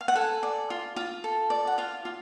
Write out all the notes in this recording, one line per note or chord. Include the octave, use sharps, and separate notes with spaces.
F5
F#5
A4 G#5
D5
F4
F4
A4
D5
F#5
F4 F5
F4